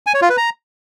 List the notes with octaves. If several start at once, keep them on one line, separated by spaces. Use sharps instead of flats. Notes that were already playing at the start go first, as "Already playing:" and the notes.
G#5
C#5
F4
B4
A#5